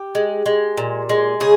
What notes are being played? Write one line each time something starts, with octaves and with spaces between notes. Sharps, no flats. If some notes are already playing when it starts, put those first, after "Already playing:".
Already playing: G4
G#3
G#3
A#2
G#3
C#3 G#4